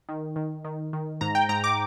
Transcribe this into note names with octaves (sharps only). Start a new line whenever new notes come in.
D#3
D#3
D#3
D#3
G#2 A#5
G5
G#2 A#5
D6